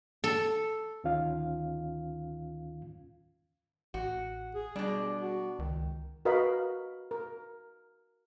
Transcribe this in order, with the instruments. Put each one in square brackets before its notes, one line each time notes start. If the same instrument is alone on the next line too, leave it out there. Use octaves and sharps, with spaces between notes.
[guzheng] A4
[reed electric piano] D2 D#3 C#4 F4 F5
[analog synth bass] A1 [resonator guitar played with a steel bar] F#4
[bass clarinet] G#4
[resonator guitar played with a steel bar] B2 D4 [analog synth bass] G3
[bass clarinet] F#4
[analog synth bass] C#2 [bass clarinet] D#3
[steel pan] F#4 A#4 B4 D#5 F5 B5
A#4